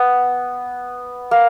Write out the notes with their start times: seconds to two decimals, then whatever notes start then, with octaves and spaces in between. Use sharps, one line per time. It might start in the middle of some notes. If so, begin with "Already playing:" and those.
Already playing: B3
1.31 A#3